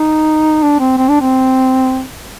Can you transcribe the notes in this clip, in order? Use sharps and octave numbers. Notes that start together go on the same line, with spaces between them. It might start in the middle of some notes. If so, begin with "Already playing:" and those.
Already playing: D#4
D4
C4
C4
D4
C4